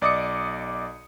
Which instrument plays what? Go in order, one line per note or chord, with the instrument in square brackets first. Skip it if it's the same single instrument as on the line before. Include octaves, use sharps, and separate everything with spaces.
[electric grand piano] B1 D5 D#5 D6 D#6 C#7